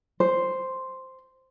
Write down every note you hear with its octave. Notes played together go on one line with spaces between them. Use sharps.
C5